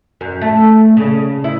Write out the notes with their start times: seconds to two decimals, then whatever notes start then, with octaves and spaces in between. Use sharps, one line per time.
0.21 F#2
0.41 A3
0.97 C#3
1.44 E4